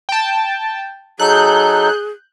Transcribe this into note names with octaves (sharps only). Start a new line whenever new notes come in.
G5 A5
F#3 D#4 G#4 A4 F#6 G6